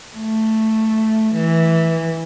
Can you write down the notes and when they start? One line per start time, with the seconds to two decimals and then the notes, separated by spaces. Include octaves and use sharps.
0.15 A3
1.34 E3